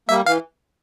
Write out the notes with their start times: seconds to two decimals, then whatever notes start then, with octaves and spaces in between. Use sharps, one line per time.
0.09 G3 A#3 E5
0.26 E3 F5